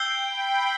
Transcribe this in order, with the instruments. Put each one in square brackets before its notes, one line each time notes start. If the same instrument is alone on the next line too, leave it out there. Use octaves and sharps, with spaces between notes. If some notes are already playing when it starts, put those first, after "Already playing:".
Already playing: [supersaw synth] G5 [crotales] E6 G6 C7 G7
[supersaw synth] B5